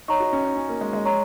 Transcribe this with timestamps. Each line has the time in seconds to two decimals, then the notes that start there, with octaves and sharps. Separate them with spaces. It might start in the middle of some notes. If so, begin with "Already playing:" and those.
0.08 D#4 C#5 A#5 C#6
0.20 F#4
0.33 C#4
0.45 D#4
0.57 C#4
0.69 A#3
0.81 G#3
0.93 G#3
1.05 C#5 A#5 C#6